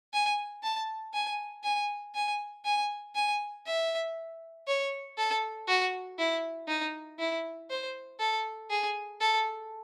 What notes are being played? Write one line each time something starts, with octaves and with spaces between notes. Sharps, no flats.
G#5
A5
G#5
G#5
G#5
G#5
G#5
E5
C#5
A4
F#4
E4
D#4
E4
C5
A4
G#4
A4